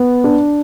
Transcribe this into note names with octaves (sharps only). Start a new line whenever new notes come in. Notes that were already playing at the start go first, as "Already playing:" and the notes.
Already playing: B3
D4